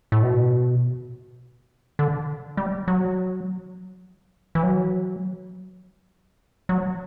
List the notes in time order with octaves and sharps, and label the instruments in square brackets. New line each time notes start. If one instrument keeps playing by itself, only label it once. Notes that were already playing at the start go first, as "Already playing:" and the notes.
[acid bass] A2
B2
D3
G3
F#3
E3
F#3
F#3